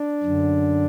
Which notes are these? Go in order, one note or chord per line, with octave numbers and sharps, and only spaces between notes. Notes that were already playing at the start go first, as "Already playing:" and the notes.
Already playing: D4
F#2 D3